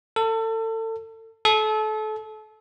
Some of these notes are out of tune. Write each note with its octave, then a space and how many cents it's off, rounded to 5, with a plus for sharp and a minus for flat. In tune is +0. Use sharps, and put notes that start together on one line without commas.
A4 +30
A4 -30